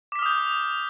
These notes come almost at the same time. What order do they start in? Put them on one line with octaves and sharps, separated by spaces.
D6 B6 F6 D#6 G6